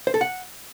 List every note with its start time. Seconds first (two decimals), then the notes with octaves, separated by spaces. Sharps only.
0.07 C5
0.14 A4
0.21 F#5